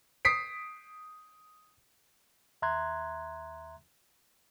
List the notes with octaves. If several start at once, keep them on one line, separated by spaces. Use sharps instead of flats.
D#6 B6 C7 D7
D#2 E5 A#5 C6 F#6 G#6